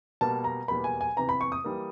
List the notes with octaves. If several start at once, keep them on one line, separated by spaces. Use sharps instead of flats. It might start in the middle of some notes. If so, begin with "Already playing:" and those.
B2 G3 A#3 A5
A#5
E2 B2 G3 A#3 B5
G#5
G#5
E2 C3 E3 A#5
B5
C#6
D#6
E3 G3 A#3